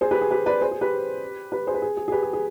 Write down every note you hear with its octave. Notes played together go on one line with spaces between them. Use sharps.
G#4 C5
G4 B4
G#4
G4 B4
B4 D5
G#4 C5
G#4
G4 B4
G4 B4
G#4 C5
B4
G#4
G#4
G#4
G4 B4
G#4
G#4